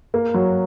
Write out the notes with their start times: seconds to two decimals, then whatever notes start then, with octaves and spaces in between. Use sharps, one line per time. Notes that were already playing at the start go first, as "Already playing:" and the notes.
0.14 A#3
0.34 F#3